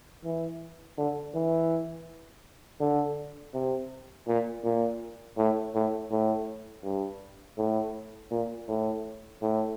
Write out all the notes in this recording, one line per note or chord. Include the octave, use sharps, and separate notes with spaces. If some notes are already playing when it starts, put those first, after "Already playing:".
E3
D3
E3
D3
C3
A#2
A#2
A2
A2
A2
G2
A2
A#2
A2
A2